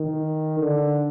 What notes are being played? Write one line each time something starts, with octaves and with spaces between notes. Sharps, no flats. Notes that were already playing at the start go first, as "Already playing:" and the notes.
Already playing: D#3
D3